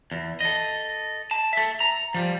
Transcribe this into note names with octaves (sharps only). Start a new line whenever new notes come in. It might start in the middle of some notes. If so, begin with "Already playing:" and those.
E2
A4 D#5
A5
A4 E5
A#5
F3 G3